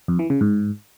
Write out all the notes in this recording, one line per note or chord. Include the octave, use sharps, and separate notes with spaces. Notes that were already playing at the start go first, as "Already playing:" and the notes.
F2
E3
C#3
G#2